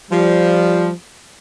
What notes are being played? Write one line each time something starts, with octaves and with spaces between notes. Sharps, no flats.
F3 G3